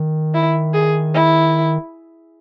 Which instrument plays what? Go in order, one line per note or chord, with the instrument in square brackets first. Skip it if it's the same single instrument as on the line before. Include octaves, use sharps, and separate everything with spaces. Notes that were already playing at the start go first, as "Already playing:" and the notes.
Already playing: [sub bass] D#3
[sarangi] E4
G#4
E4